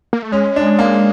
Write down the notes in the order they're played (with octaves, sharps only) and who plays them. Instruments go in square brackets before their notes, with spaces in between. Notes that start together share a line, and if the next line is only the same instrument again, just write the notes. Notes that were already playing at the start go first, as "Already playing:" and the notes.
[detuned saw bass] A#3
A3
[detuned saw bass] G#3 [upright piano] C#4
[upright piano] D4
A#3